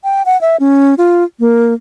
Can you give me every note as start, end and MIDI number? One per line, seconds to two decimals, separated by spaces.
0.04 0.23 79
0.26 0.40 78
0.41 0.57 76
0.60 0.95 61
0.98 1.24 65
1.40 1.74 58